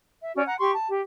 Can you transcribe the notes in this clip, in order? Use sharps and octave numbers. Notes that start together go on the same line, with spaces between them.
E5
C#4 F#4 D5
F#5 A#5
G4 C6 C#6
A5
G4